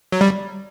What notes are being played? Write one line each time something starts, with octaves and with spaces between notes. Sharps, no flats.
F#3
G3